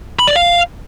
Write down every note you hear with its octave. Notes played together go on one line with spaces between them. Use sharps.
B5
D5
F5